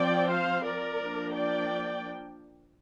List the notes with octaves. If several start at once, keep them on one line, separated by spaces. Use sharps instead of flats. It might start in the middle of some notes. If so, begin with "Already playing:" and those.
Already playing: F3 C4 D5 G5
C5 F5
A#4 D5
F3 A#3 D4
D5 G5